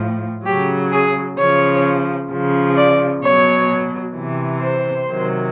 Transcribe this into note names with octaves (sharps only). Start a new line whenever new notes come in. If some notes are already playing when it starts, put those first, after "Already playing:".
Already playing: A2 F3
C#3 F#3 G4
G#4
C#3 F3 C#5
C#3 F3
D5
B2 F#3 C#5
C3 E3
C5
C3 D#3 F#3